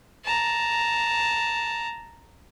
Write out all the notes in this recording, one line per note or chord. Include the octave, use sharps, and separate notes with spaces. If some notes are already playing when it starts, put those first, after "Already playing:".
A5 A#5